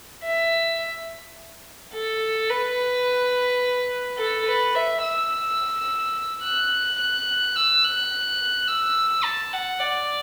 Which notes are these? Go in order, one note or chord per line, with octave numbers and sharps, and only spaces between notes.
E5
A4
B4
A4
B4
E5
E6
F#6
F#6
E6
F#6
E6
A5
F#5
D5